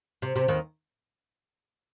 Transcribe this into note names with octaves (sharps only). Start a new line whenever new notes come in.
C3
C3
D#2 D#3